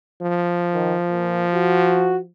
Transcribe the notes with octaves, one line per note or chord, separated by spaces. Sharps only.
F3
D#3
A#2
F#4